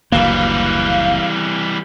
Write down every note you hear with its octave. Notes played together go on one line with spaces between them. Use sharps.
F#1 D2 E3 G3 A#3 F5